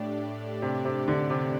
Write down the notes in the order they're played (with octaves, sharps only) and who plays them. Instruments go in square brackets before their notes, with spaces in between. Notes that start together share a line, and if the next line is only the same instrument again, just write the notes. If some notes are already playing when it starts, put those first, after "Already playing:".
Already playing: [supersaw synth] A2 A3 D4 G4 D5
[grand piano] C3
C3
D3
C3